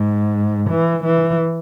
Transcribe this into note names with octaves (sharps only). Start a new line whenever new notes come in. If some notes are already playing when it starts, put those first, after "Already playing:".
Already playing: G#2
E3
E3